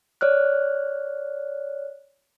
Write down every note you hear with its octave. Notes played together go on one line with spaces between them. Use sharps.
C#5 D5 F6 F#6